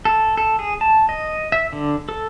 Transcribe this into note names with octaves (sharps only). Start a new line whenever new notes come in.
A4
A4
G#4
A5
D#5
E5
D3
A4